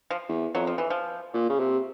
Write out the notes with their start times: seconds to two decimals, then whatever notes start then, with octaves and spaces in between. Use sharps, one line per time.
0.10 F3
0.29 E2
0.55 F2 F#3
0.67 F3
0.78 E3
0.90 F3
1.34 A#2
1.49 C#3
1.60 C3